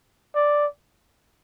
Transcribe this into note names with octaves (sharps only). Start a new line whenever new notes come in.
D5